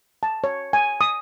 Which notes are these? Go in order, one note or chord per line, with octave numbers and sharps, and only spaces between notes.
A5
C#5
G#5
D#6